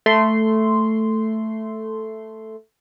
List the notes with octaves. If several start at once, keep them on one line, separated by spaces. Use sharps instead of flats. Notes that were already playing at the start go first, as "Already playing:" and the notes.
A3 C6